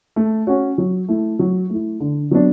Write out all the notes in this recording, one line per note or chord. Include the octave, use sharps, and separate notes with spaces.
A3
C#4 F#4 C#5
F#3
A3 E4
F#3
A3 E4
D3
F#3 B3 D4